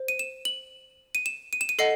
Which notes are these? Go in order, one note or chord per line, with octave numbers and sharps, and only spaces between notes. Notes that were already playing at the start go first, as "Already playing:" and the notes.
Already playing: C5
D#7
E7
F#7
D#7
E7
D#7
E7
D#7
A4 D#5 F#5 C7